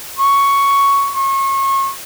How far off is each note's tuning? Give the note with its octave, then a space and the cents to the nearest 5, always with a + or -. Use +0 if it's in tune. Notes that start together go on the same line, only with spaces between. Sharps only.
C#6 +5
C#6 -35